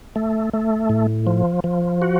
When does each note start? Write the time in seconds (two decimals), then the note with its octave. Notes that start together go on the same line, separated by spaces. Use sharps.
0.16 A3
0.53 A3
0.89 A2
1.27 F3
1.64 F3
2.02 F#4